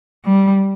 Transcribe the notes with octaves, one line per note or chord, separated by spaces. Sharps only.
G3